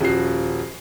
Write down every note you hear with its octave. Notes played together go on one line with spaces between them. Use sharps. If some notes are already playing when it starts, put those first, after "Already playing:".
D#1 F3 F#4 C7